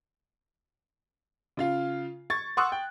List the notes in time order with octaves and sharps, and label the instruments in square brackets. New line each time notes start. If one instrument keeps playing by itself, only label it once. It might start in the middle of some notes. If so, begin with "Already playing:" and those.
[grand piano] C#3 F4 F5
C#6 G#6 A6
F#5 C6 C#6 D#6 E6 F#6
G5